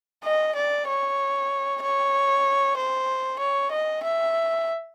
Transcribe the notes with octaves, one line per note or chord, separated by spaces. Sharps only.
D#5
D5
C#5
C#5
C5
C#5
D#5
E5